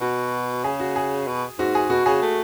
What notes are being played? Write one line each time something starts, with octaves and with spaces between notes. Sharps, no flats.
B2 F#4
C#3 G#4
F#4
G#4
B2
G#2 F#4
G#4
B2 F#4
C#3 G#4
A3